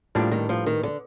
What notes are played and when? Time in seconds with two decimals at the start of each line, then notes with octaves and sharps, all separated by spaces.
0.15 A2 F3 G3 A#3 D4
0.31 D#3
0.49 F3
0.66 D#3
0.83 D3